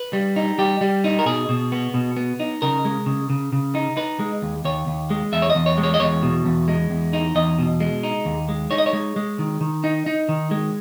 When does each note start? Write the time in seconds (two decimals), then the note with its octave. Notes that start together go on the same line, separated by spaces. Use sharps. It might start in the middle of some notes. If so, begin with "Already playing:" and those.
Already playing: B4
0.13 G3
0.36 D#4
0.58 G3 G4
0.81 G3
1.04 D#4
1.19 A#4
1.26 B2 G#4
1.49 B2
1.72 B3
1.94 B2
2.17 B3
2.40 D#4
2.62 C#3 A#4
2.85 G#3
3.06 C#3
3.30 C#3
3.53 C#3
3.75 D#4
3.97 D#4 B4
4.19 G#3
4.42 D#2
4.65 D#2 C#5
4.87 D#2
5.10 G#3
5.32 E2 E5
5.42 C#5
5.50 D#5
5.55 E2
5.66 C#5
5.78 G#3
5.83 C#5
5.94 D#5
6.00 E2 C#5
6.22 B2
6.45 E2
6.68 G#3
6.90 E2
7.13 D#4
7.35 E2 D#5
7.59 B2
7.80 G#3
8.03 D#4
8.25 D#2
8.49 G#3
8.71 D#4 C#5
8.78 D#5
8.86 C#5
8.93 G#3
9.16 G#3
9.39 D#3
9.61 D#3
9.84 D#4
10.06 D#4
10.29 D#3
10.51 G#3